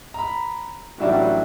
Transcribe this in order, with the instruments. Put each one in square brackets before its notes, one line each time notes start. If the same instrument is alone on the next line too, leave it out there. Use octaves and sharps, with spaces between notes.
[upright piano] A#5 B5
[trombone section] A1 F#3 G3 [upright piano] D4 E4 F#4